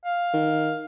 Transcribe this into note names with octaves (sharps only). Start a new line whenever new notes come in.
F5
D#3